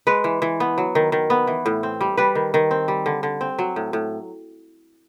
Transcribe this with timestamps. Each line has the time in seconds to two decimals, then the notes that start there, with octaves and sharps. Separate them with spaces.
0.07 G#3 B4
0.24 E3
0.42 E3
0.60 B3
0.78 F#3
0.95 D#3
1.12 D#3
1.30 B3
1.47 E3
1.66 A2
1.83 C4
2.01 G3
2.17 G3 B4
2.35 D#3
2.54 D#3
2.71 C4
2.88 G3
3.06 D3
3.23 D3
3.41 C4
3.59 F#3
3.76 A2
3.93 A2